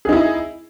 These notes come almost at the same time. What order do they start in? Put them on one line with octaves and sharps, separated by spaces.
G#4 D#4 E4